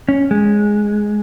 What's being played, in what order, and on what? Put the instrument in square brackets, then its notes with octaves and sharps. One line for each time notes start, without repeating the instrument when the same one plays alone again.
[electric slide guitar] C#4
G#3